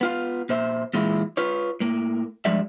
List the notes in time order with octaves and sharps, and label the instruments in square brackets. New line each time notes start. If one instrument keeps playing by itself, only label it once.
[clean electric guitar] B3 F4 F5
A#2 C5 E5
A#2 E3 G#3 E4 F4
F4 B4 C#5
A2 A#3
G2 F3 G#3 F#4 D5 E5